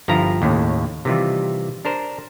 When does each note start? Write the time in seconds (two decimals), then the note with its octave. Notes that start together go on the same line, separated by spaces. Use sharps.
0.08 G1 G2 F3 E4 F4 A#5
0.42 D#2 A2 C#3
1.05 C3 D#3 E3 G3 F4
1.85 D4 A#4 C5